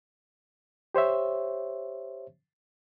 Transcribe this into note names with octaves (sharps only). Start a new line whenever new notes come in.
G4 C5 C#5 E5